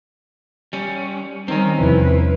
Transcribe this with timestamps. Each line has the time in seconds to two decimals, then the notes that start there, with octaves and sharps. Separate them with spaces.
0.73 G3 C#4
1.48 D#3 G3 C4 C#4
1.79 E2 C3 F3 E4 B4